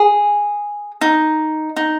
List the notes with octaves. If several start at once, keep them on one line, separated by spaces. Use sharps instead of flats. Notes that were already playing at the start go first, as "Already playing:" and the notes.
Already playing: G#4
D#4
D#4